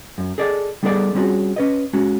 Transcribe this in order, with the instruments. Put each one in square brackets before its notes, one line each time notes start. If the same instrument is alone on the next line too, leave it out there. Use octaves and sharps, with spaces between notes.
[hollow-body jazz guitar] F#2
G#4 A4 D5 D#5
G3 B3 D#4 G#4 A4 D5
G3 C4 C#4 F4 F#4 G#4
C#4 B4 D#5
G#3 C#4 F#4